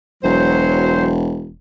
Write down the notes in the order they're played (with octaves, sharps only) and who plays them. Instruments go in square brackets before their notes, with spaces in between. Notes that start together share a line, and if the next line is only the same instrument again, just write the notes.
[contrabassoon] E1 [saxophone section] F#3 C5